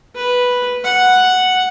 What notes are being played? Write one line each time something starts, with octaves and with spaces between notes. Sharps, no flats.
B4
F#5